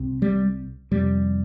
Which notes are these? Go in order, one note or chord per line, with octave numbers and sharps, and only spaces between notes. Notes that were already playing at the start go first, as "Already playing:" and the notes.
Already playing: C2 C3
G3
F2 C3 G3